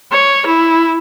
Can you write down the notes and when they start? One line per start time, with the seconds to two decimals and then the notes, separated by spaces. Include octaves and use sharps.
0.12 C#5
0.46 E4